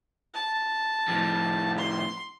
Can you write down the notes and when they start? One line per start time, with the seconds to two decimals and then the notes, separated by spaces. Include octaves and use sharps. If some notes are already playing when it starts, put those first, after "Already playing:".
0.34 A5
1.08 F2 A2
1.78 C6